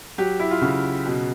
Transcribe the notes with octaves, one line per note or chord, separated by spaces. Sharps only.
F#3 G4
E4
F4
C#3 F#4
B2